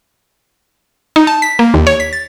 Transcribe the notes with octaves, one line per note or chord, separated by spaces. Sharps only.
D#4
A5
B6
A#3
D#2
C#5
B6
A6